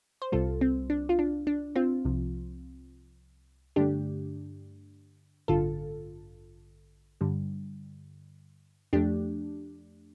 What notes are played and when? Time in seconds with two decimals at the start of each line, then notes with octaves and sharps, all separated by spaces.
0.22 C5
0.32 C2 C3 G3 F4 A4
0.61 C4
0.90 D4
1.09 F4
1.19 D4
1.47 D4
1.76 C4 F4
2.05 C2 C3 F3
3.76 G2 D3 A3 D4 G4
5.48 A1 G2 D3 F4 A4
7.21 G2 D3 G3
8.93 F2 F3 A3 D4 G4